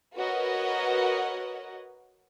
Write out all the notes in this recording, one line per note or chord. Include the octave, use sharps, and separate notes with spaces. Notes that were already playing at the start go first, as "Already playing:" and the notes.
F#4 A#4 B4 C#5 D#5 F#5